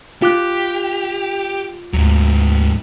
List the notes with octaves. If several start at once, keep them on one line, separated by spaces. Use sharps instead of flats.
F4 G4 D6 F#6
D2 G#2 F#3